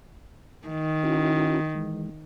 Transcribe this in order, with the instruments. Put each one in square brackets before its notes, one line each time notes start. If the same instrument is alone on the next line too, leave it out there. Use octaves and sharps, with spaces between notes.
[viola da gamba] D#3
[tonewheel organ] C#4 E4 F#4
E3 G#3